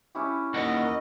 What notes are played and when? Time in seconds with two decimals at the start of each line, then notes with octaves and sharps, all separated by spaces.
0.15 C#4 E4 G4
0.54 D#2 A#4 D#5 F#5